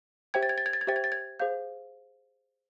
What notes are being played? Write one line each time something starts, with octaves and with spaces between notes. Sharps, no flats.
G4 C5 E5 G5 G#6
A6
G#6
A6
G#6
A6
G#6
G4 C5 E5 G5 A6
G#6
A6
G#6
G#4 C5 F5 G6